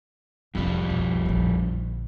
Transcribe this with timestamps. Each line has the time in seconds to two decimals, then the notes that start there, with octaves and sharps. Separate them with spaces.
0.55 F1 F2 G3 C4
0.90 B1
1.26 A#1 D3